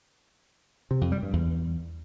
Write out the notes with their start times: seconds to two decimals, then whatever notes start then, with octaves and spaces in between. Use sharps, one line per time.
0.91 C3
1.01 F2
1.12 G3
1.22 G2
1.33 E2